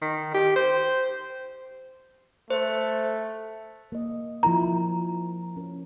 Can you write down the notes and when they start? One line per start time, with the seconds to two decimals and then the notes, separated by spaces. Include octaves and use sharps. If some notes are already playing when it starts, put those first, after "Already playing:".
0.02 D#3
0.34 G4
0.56 C5
2.50 A3 C5
3.92 A#3 D#5
4.43 F3 E4 A#4 A#5
5.56 C#4 A#4